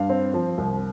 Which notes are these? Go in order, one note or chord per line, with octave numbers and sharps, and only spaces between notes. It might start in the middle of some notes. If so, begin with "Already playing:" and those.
Already playing: G2 F5
C4
F3
C2